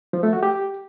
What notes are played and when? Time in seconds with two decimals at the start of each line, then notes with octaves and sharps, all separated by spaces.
0.13 F3
0.23 A3
0.33 F#4
0.43 G4